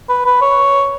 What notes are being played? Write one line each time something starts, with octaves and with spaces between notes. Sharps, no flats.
B4
B4
C#5